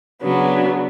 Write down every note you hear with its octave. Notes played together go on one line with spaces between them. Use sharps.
C#3 F#3 B3 D4